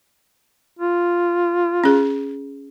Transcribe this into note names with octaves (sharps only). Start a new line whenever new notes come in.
F4
C#4 G#4